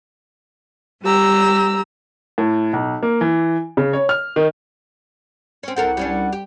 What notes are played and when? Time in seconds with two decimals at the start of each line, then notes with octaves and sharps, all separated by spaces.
1.03 G3 G4 A#5 E6
2.38 A2
2.73 B1
3.03 A#3
3.21 E3
3.77 C#3
3.93 C#5
4.09 F6
4.36 D#3
5.63 C4 C#4
5.76 C2 C4 A4 A#4 F#5
5.97 G3 C#4 D4
6.32 G4